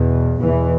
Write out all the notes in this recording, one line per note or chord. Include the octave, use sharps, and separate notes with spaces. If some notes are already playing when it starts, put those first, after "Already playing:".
Already playing: E2 B2
E2 B2 E3